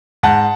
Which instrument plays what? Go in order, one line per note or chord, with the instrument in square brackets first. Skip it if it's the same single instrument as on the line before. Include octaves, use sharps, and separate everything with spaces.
[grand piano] G#2 F#5 A5